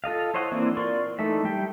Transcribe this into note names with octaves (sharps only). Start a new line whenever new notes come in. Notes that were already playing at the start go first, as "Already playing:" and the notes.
F4 A4 D#5 F5
E4 C5 C#5 D#5 F#5
E3 A#3 C4 D4 E4
F4 A#4 D5 C6 C#6
E3 A3 D#4 E5
G3 E5 G5